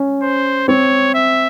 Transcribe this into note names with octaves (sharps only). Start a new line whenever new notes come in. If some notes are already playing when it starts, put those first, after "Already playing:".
Already playing: C#4
C5
C4 C#5
E5